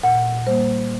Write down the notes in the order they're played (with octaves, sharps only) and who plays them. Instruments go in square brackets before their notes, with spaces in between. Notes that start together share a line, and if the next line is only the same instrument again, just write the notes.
[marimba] A#2 F#5
G3 A#3 C5